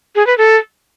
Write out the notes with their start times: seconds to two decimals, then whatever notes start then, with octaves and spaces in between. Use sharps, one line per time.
0.16 G#4
0.27 B4
0.38 A4